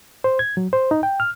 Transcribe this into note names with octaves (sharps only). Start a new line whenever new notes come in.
C5
G#6
F#3
C5
D#4
G5
F6